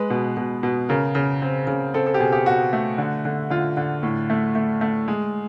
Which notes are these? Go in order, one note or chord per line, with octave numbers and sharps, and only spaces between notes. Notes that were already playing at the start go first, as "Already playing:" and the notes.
Already playing: G#3 B4
B2
B2
B2
C#3 A#4
C#3
C4
C#3
C4 A4
A4
G4
B2 G#4
G4
B2 F#4
A3
D3
D3
D3 F4
D3
A2
A3
A3
A3
G#3